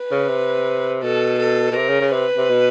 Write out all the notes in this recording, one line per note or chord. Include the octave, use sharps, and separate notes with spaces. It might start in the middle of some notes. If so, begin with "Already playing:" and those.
Already playing: B4
C#3
C3
B2 A4
A4
B2
C3 A#4
C#3
C#3
C3 B4
C3
B2